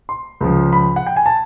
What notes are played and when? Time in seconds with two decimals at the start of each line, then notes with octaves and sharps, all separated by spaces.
0.09 C6
0.41 C#2 C#3 F3
0.73 B5
0.96 F#5
1.07 G5
1.16 G#5
1.26 A5